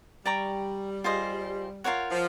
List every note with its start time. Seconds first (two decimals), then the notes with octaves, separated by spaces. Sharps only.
0.25 G3 D5 G5 A#5 C#6
1.04 F4 G#4 C5 D#5
1.84 F4 A#4 C#5 F#5
2.11 F3